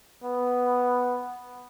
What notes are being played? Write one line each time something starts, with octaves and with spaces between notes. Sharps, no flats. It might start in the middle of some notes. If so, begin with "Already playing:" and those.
B3